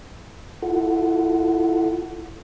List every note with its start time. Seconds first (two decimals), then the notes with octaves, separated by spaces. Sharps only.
0.62 E4 F4 A4 F#5